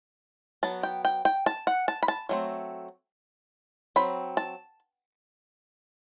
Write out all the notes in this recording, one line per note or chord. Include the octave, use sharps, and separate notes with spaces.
F#3 B3 A5
G5
G5
G5
A5
F#5
A5
B5
A5
F#3 A3 C4
F#3 C4 B5
A5